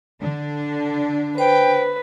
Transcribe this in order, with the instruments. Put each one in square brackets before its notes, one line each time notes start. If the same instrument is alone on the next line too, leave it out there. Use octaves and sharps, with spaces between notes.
[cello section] D3 D4
[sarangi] B4 [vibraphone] C5 [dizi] G5